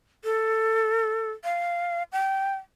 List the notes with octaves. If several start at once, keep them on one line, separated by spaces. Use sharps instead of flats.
A4
F5
G5